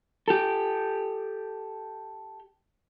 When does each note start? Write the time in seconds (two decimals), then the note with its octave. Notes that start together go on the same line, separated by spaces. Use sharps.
0.28 G4 A4